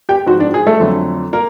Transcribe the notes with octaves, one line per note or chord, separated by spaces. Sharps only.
G4 G5
G#2 F3 F#4 F#5
D4 D5
G#4
A3 A4
F2 D3 F#3
A#3 A#4